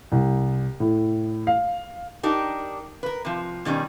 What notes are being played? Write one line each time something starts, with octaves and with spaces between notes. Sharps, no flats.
C2
A2
F5
D4 D#4 G4 A#4
A#4 B4
C3 F3
B2 D#3 G3 C#4